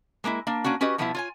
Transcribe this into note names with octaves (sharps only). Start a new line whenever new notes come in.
G#3 A#3 D#4 E4
A#3 D4
A#3 C#4 D4 F#4
C#4 F#4 G4 B4 D#5
B2 F3 G3 B3 C#4 E4
F4 C#5 G#5